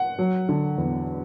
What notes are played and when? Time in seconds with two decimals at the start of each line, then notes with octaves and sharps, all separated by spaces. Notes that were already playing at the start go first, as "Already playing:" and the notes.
Already playing: F#5
0.19 F#3
0.49 D3
0.78 E2